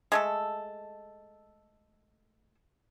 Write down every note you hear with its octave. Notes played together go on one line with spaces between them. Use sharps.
G#3 A3 A4